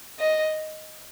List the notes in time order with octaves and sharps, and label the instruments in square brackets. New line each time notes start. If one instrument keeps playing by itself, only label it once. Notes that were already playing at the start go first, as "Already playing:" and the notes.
[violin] D#5